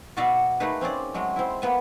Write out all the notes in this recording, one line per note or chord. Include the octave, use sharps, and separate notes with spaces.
B2 B3 F#4 D5 E5 F5
A3 A#3 D#4 G#4 B4
C4 C#4 G#4 D5
F#3 G#3 A3
C4 E4
A#3 B3 G#5